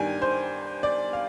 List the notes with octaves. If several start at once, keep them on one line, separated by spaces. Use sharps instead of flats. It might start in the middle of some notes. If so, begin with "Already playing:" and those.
Already playing: G2 D#3 G3 G#5
C5
D5
F5